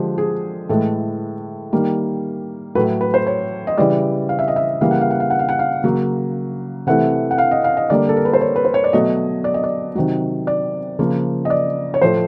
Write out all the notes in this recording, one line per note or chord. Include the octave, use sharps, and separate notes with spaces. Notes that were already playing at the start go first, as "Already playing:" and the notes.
Already playing: D3 F3 G#3 G4
G#4
A2 E3 G#3 A4
D#3 G3 A#3
A2 F#3 A3 B4
B4
C5
C#5
D#5
C#3 E3 G3 D5
F5
E5
D#5
E5
C#3 E3 G3 A#3 F5
F#5
F5
F#5
F5
F#5
F5
F#5
F5
C#3 F#3 A#3
C3 E3 A3 F#5
F#5
F5
D#5
F5
D#5
D3 G3 A#3 D5
A4
A#4
B4
C5
C#5
B4
C5
C#5
D5
B2 F#3 A3 D#5
D5
D#5
D5
C3 D#3 F#3
D5
C#3 F3 A#3
D#5
D5
C#5
A2 F3 A3 C5